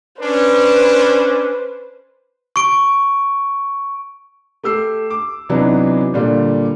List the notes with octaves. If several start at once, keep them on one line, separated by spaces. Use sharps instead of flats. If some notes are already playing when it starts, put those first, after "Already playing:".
C#4 D4 B4 C5
C#6 D7
A3 G4 E6 C7
D6
C3 E3 F#3 B3 D4 D#4
A#2 D3 G3